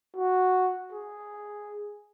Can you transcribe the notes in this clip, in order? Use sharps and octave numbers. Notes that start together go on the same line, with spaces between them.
F#4
G#4